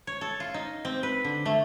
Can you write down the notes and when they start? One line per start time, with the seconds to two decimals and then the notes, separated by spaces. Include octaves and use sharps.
0.07 C#5
0.21 A4
0.40 F4
0.54 D#4
0.85 C4
1.03 B4
1.24 D3
1.45 A3